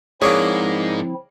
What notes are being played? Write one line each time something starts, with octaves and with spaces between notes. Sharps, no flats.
G#2 F3 A#3 C4 D4 E4 G#4 C#5